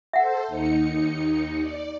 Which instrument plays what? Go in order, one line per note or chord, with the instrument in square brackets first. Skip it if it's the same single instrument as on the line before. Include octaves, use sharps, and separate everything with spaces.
[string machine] A4 C5 [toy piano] E5 F#5
[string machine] D#2 D#4 C#7
D5